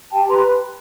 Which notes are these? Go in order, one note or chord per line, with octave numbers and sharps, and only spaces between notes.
G4 G5 A5
B4 A#5 C6